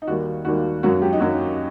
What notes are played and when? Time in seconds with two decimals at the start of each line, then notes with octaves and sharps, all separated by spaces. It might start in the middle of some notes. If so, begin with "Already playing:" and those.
0.02 D#4
0.07 D#2 D#3 G3 A#3 F#4
0.45 D#2 D#3 G3 A#3 F#4
0.83 F#2 F#3 A#3 F#4
1.02 G4
1.13 D#4
1.20 F#2 F#3 A#3 F#4